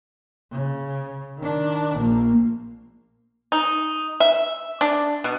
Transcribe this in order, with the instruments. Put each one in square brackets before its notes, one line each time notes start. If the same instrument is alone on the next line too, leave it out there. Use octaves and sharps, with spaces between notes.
[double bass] C#3
D#3 D4
A#1 A#3
[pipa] D#4
E5
D4
B2